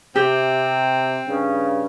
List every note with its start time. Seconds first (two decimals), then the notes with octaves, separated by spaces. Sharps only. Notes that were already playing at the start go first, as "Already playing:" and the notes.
0.16 C3 C4 G4
1.27 G2 C#3